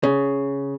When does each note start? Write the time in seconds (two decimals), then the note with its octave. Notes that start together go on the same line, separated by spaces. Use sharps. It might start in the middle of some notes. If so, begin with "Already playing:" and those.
0.03 C#3